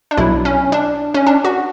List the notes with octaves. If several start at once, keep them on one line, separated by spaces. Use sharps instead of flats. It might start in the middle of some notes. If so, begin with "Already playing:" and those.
D4
B1 B2 F#3 E4
C#4
D4
C#4
D4
F#4